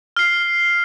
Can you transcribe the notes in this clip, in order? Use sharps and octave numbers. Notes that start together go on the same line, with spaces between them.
F6 C7